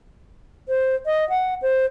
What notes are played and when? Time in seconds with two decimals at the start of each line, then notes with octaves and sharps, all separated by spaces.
0.69 C5
1.06 D#5
1.29 F#5
1.62 C5